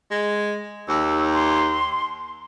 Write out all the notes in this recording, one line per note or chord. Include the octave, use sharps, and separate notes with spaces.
G#3
D#2 E6
C6